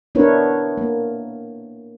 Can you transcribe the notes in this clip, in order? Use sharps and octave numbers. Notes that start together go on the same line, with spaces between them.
B3 D4 E4 A#4 B4 C#5
A#3